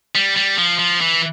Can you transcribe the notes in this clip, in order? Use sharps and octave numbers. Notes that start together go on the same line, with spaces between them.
G3
G3
F3
F3
E3